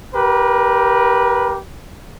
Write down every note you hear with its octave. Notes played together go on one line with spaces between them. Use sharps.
G4 A#4 B4